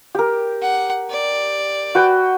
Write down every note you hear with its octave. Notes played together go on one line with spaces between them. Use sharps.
G4 A#4
F#5
D5
F#4 B4 G5